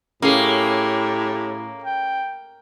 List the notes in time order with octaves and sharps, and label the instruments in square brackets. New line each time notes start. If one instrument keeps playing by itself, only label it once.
[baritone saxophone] A2 [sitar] A#3 [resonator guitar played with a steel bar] C#4 G#4 [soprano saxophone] G4
[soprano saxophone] G5